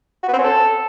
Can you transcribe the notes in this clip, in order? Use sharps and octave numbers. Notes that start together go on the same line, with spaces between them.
F#4
B3
C4
C#4
A4